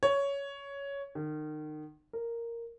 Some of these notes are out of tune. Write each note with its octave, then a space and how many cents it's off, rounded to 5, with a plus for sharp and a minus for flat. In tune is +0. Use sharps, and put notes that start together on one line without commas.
C#5 +10
D#3 -30
A#4 -5